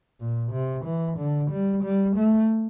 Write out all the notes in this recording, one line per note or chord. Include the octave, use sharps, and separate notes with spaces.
A#2
C3
E3
D3
G3
G3
A3